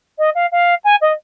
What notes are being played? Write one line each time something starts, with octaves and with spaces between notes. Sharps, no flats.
D#5
F5
F5
G#5
D#5